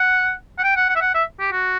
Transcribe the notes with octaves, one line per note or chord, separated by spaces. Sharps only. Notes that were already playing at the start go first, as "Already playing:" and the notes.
Already playing: F#5
F#5
G5
F#5
F#5
E5
F#5
E5
G4
F#4